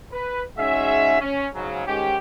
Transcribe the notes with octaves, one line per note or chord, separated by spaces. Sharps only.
B4
G#3 C#4 D#4 F#4 G#4 E5
C#4
G#2 C#3 F#3
G#2 D#3 G#3 C#4 G4